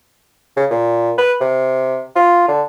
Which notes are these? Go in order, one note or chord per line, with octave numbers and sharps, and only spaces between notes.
C#3
A#2
B4
C3
F4
D3